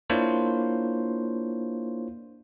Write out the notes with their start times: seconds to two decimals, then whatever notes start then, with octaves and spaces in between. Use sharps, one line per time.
0.10 A#3 D4 E4 F4 C5 C#5